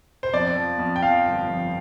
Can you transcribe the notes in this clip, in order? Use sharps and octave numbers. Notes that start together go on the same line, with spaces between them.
C5
F2 D5
F3
F2
G5
F3 F5
G1
F2